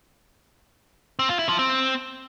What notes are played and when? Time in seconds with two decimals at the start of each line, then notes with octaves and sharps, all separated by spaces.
1.19 C4
1.29 F4
1.39 E4
1.49 F3
1.59 C4